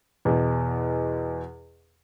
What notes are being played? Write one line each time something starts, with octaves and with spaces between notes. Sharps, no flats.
E2 B2